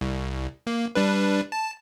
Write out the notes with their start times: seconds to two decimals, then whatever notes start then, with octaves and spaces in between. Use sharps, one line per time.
0.01 C2
0.67 A#3
0.95 G3 D4 B4
1.52 A5